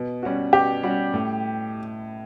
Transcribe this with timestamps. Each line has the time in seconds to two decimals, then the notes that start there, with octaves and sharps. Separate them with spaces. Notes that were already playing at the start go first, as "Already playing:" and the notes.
Already playing: B2
0.23 G3 C#4 F#4
0.53 B2 G4
0.83 G3 C#4 F#4
1.14 A2